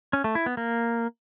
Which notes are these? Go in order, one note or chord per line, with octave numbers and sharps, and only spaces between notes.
C#4
A3
E4
B3
A#3